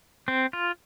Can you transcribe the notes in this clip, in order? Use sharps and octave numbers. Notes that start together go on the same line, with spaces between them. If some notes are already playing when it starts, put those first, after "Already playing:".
C4
F4